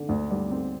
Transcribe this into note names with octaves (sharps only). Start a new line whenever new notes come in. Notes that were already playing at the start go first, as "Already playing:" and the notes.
Already playing: D3
D2
G3
C4